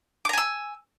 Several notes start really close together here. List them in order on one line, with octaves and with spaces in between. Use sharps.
D6 A#5 G#5 E6